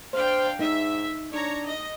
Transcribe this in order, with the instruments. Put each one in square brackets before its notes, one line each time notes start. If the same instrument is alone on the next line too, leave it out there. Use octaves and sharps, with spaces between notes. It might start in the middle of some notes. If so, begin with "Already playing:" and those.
[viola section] D4 F5 G5 [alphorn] C5
[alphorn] G#2 [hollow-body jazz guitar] D#4 [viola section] E5
[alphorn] D4 [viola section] C#5 A#5
[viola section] D#5